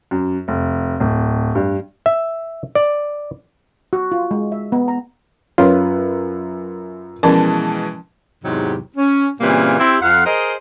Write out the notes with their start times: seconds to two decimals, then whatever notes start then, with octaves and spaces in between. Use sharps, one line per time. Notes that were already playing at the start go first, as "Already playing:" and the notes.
0.11 F#2
0.48 F1
1.00 D1
1.55 G2
2.06 E5
2.75 D5
3.93 F#4
4.12 F4
4.31 G#3
4.52 E5
4.72 B3
4.88 A#5
5.58 F#2 F4 B4 C#5
7.23 B2 E3 F3 G#3 C#4 A#4 A5
8.45 E2 G#2 C3 F#3 D#4 G4
8.97 C#4
9.40 A#2 C#3 E3 G3 A#3 C4
9.80 C4 E4 G4
10.02 F2 F5 F#5
10.26 G#4 A#4 C5 D#5